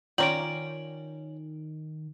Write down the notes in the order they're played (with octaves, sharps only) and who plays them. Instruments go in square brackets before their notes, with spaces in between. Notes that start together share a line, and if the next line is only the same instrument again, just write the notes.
[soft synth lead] D#3 [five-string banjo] C#4 G5 [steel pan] F4 D5 A#5 [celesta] D7 F#7